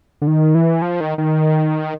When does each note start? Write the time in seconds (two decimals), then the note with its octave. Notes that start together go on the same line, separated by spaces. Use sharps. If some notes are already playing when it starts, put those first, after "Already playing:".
0.22 D3
0.27 D#3
0.55 E3
0.82 F3
1.01 D#3
1.18 D#3